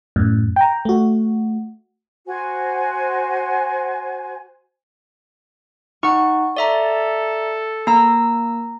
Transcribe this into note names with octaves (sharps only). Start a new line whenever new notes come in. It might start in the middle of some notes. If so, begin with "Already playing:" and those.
F#2 A2
G5 A#5
A3 F#4
F#4 C5 G#5
D#4 F#5 C#6
A4 D5 E5 A#5
A#3 A#5 E6